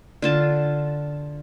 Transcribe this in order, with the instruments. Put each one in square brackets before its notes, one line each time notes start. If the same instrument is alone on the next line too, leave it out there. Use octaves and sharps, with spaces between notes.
[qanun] D3 F4 A5